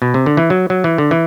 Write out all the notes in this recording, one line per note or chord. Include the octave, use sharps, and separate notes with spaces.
B2
C3
D3
E3
F#3
F#3
E3
D3
E3